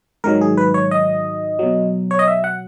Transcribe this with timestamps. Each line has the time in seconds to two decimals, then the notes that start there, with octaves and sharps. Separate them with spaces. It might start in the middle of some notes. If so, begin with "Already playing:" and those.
0.24 G#2 D#3 F#3 A#4
0.41 G#4
0.57 B4
0.74 C#5
0.91 D#5
1.59 B2 F#3
2.11 C#5
2.19 D#5
2.28 E5
2.44 F#5